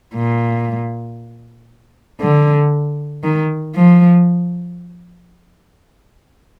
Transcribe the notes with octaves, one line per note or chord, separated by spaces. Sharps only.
A#2
D3
D#3
F3